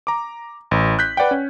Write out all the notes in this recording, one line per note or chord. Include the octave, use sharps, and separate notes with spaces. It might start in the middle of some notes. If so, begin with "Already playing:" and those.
A#5 D6
A1
F#6 G6 B6
B4 D5 F#5 G5
C#4